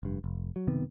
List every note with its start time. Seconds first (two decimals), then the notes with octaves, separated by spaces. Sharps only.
0.03 F1 G2
0.24 F1
0.56 F#3
0.67 F#1 C3 D#3 B3